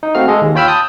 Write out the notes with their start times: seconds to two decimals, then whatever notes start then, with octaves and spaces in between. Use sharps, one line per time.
0.03 D#4
0.15 A3 C4 F#4 F5 F6
0.28 G#3 G#4 A4 D#5
0.41 D#2
0.55 F4 C#5 G5 B5 E6 F6
0.67 A5 D#6 G6